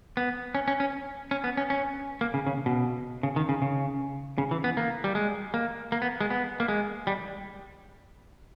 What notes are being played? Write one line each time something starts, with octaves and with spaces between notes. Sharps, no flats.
B3
C#4
C#4
C#4
C#4
B3
C#4
C#4
A#3
C#3
C#3
B2
C#3
D#3
C#3
C#3
C#3
E3
B3
A#3
G3
G#3
A#3
A#3
B3
G#3
B3
A#3
G#3
G3